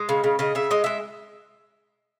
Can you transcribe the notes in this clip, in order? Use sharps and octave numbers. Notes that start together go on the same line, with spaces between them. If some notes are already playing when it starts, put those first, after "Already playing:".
Already playing: G#3 D#5
C#3
C#3
C#3 D#5
C#3 E5
G#3 D#5
G#3 E5